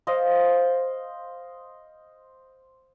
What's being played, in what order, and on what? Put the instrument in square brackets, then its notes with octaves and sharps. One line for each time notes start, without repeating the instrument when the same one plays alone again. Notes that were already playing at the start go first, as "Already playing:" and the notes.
[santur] C5 D#5 F5